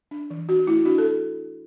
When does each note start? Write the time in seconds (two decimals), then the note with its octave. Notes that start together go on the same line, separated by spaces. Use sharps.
0.11 D4
0.30 E3
0.49 D4 F#4
0.67 A3 E4
0.85 D4 F#4
0.98 A4